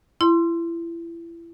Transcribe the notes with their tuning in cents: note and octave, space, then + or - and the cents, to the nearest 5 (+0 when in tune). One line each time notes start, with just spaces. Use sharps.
E4 +30 C6 +0